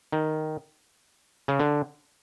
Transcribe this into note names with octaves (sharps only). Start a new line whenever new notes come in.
D#3
C#3
D3